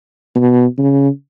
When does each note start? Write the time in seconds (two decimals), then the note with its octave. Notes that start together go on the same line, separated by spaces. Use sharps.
0.35 B2
0.78 C#3